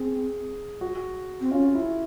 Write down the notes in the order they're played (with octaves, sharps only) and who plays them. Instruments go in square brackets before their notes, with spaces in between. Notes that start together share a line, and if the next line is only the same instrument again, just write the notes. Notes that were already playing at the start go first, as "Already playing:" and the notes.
Already playing: [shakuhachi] C4 [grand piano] G#4
[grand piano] F#4
[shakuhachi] C4
[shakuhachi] C#4 [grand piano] F4
[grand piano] E4